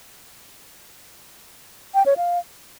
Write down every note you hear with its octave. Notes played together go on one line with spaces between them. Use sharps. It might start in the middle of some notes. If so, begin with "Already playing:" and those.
G5
C#5
F5